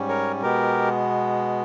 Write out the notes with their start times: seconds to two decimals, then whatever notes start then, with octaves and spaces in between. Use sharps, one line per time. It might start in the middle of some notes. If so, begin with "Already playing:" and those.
Already playing: G#2 G3 C#4
0.09 A#4 C#5
0.42 B2 G#3 B3 G4 A#4